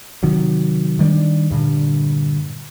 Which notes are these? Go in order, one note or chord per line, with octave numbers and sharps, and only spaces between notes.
C3 D#3 F#3
D#3 G3 A#3 D4
G2 A#2 D3